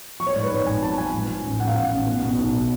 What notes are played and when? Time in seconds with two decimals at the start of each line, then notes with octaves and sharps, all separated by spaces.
0.20 F3 C#6
0.26 C#5
0.32 D5
0.36 G#2
0.43 B4
0.51 G#1 C#5
0.66 G#1 G#5
0.82 F3 A5
0.98 F3 G#5
1.14 G#2
1.28 F3
1.45 A1
1.60 A1 F#5
1.67 F5
1.75 A1 F#5
1.91 A1
2.06 B2
2.22 B2
2.38 B1